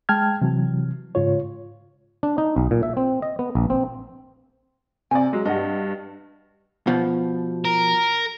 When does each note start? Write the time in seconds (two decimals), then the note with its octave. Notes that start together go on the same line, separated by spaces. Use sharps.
0.09 G#3 G5 A5 F6 G#6
0.42 C3 E3 F#3
1.15 G#2 C#3 F4 C#5
2.23 D4
2.38 D#4
2.56 B1
2.71 A#2
2.83 E5
2.97 C4
3.22 D#5
3.39 B3
3.55 A#1
3.70 C4
5.11 C3 D5 G#5
5.33 F#3 G#3
5.45 G2 G3 D#5 F#5
6.87 B2 F3
7.65 A#4